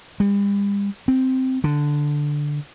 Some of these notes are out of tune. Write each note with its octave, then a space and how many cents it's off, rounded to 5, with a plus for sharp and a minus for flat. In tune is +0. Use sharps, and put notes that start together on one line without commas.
G3 +40
C4 -5
D3 +0